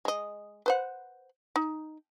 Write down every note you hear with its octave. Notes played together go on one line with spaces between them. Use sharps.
G#3 D#5
B4 C5 F#5
D#4